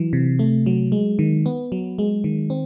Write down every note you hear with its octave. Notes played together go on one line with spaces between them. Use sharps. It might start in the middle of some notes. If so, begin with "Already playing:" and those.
Already playing: E3 F#3
C3
A3
F#3
G#3
D#3
B3
F#3
G#3
D#3
C4